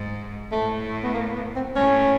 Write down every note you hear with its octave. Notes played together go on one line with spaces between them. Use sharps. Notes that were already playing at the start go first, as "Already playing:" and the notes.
Already playing: G#2
A2 A3
B3
A#3
B3
C4
A2 C#4